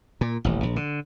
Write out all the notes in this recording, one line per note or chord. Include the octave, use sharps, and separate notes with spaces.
A#2
D#1 A1
A#1
D3